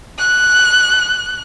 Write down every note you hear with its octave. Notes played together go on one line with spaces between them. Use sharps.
F#6